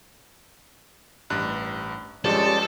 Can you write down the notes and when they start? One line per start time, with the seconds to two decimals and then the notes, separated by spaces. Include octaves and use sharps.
1.30 A1 G2 F#6
2.25 G2 F3 G#3 C#4 G4 A4 D5 A5